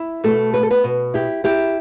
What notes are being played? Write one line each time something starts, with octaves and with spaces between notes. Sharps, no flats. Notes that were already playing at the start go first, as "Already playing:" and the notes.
Already playing: E4
B2 A3 A4
B3 B4
A4
B3 B4
B2
E4 G4
E4 G4